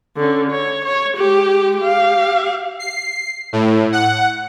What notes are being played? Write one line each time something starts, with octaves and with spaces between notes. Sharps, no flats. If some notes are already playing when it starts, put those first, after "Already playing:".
D3 C#4
C#5
C#5
G#3 G4
G4 F5
C7
A2
F#5